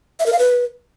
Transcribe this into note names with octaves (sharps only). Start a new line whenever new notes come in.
E5
A#4
F5
B4